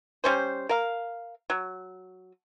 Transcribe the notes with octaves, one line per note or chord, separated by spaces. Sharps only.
G3 C#4 C5
A#4 F5
F#3